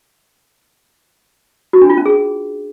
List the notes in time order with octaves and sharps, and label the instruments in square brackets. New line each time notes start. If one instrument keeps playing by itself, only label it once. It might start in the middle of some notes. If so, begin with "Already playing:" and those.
[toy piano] F#4
D4
F4
C#4
G#4